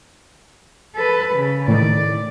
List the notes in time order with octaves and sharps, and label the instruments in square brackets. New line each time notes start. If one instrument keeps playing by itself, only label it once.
[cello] A4 B4
C#3
[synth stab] A2 D#3 [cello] D5